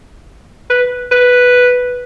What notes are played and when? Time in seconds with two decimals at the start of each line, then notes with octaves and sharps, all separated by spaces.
0.70 B4
1.12 B4